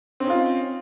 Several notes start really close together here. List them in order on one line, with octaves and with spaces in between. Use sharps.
C4 C#4 D#4 F4